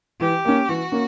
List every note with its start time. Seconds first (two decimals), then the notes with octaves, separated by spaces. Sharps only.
0.21 E3 G4
0.45 A#3 C#4
0.69 E3 F#4
0.92 A#3 C#4